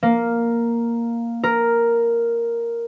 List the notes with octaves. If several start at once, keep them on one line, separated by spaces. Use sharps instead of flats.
A#3
A#4